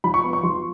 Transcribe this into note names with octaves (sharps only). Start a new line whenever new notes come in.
F3 B5
C#6
B3
C#6
F3 C6